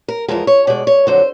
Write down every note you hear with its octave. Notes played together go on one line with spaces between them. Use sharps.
A#4
E2 C3 F3 G#3 A#4
C#5
B2 G#3 D5
C#5
F2 D3 F#3 C5